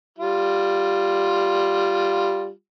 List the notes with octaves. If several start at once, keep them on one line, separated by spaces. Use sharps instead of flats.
G3 F4